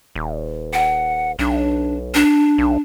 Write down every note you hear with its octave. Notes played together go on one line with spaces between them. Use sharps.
D#1
F#5
B1 D4
D4
B1